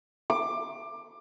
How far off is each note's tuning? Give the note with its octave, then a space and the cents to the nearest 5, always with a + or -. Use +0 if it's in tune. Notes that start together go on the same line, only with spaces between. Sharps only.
D6 +20